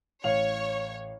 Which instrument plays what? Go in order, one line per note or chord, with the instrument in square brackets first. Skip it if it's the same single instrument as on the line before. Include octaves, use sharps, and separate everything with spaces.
[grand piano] A1 F5 F7 [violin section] C#5